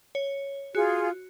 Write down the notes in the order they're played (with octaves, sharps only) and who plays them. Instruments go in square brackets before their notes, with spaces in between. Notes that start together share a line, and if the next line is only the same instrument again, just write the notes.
[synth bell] C#5
[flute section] F4 G#4 [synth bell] F#4